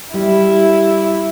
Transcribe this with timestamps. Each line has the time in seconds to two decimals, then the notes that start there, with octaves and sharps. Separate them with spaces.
0.14 G3 E4